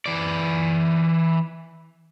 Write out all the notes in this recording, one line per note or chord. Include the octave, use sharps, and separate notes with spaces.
E3 D5